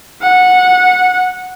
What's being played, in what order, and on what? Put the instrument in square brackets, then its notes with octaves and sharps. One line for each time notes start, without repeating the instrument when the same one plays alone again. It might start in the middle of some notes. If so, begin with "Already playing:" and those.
[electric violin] F#5